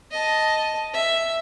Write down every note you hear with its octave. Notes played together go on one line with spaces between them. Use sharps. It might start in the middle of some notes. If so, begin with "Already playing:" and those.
D#5 A5
E5